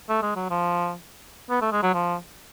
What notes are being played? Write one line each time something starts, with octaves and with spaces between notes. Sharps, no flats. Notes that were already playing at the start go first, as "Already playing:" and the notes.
A3
G#3
F#3
F3
B3
A3
G#3
F#3
F3